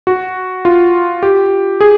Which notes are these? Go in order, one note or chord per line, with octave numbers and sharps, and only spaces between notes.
F#4
F4
G4
G#4